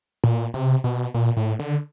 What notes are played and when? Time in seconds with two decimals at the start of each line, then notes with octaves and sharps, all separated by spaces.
0.24 A#2
0.54 C3
0.84 B2
1.14 A#2
1.37 A2
1.59 D3